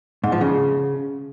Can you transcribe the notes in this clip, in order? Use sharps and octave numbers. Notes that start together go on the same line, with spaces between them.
G#2
F3
C#3